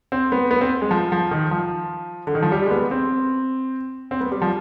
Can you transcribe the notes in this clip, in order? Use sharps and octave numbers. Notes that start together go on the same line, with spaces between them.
C4
B3
B3
C4
G#3
F3
F3
D#3
F3
D3
D#3
F3
G3
G#3
B3
C4
C4
B3
G3
F3